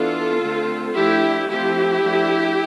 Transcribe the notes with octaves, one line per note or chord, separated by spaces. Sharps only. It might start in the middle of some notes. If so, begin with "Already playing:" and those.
Already playing: E3 B3 D4 F4 A4
D3 A3 C4
F3 A3 D4 E4 G4
F3 A3 C4 E4 G4
F3 A3 D4